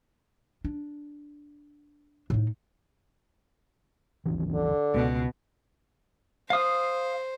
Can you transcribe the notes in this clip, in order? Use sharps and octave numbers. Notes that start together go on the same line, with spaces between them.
D4
A2 D#4
D#1 G#1 E3
D3
C#2 B2
C5 F5 D#6